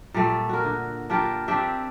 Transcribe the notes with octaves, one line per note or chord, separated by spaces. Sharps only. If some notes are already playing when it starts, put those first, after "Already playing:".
A#2 G3 A3
F#4 A#4
D3
D4 F4 G4 A#4
C4 D4 G4 E5